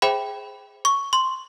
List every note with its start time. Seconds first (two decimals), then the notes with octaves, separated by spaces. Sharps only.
0.02 G#4 C5 E5 G5 B5
0.85 C#6
1.13 C6